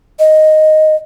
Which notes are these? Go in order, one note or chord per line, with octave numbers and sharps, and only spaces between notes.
D#5